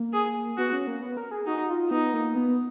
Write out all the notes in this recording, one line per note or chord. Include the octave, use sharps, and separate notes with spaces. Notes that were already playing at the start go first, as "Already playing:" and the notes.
Already playing: A#3
G#4
B3 F#4
C#4
A#3
B3
A#4
G#4
D#4 F#4
F4
B3 D#4
A#3
B3